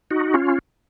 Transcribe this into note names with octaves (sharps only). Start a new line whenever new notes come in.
D#4 F#4
C#4 F4